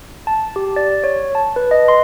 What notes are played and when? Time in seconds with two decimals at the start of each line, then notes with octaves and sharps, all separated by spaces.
0.27 A5
0.56 G4
0.76 D5
1.04 C#5
1.35 A5
1.56 B4
1.71 D#5
1.88 C6